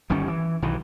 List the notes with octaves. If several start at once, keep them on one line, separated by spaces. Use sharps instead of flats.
G1 D#3 G3 C#4
E3
B1 D#3 E3